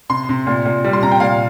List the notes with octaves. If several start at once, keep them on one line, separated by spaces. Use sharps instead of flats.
C3 C6
C3
A#2
A#2
G3
C6
C3 A#5
G5
A#2 F5